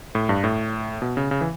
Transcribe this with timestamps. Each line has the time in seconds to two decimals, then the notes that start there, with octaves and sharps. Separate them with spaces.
0.15 A2
0.29 G2
0.44 A2
1.02 B2
1.17 C#3
1.31 C#3
1.41 E3